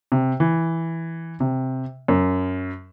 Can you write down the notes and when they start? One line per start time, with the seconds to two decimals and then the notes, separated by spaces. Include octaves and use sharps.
0.12 C3
0.40 E3
1.40 C3
2.08 F#2